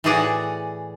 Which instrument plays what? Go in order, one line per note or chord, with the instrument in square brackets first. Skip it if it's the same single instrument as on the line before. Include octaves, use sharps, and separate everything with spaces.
[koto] A2 E3 F#4 G#4 D5 F#5